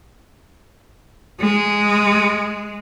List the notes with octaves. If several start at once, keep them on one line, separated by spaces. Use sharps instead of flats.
G#3